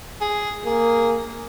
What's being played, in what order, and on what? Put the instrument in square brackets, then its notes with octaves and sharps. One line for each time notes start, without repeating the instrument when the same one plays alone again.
[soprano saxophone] G#4
[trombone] A#3 [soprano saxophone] G#4